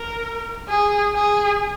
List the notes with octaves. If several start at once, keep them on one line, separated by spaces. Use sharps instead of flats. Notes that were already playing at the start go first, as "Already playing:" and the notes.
Already playing: A#4
G#4
G#4